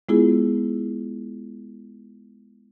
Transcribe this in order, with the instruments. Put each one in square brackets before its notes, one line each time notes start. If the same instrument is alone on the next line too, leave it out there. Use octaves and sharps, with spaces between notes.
[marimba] G#3 B3 E4 F4 G#4